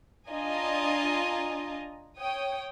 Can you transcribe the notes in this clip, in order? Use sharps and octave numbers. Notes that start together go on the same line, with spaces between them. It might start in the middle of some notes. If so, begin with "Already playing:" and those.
D4 F4 D#5 G#5 A#5
C#5 G5 D#6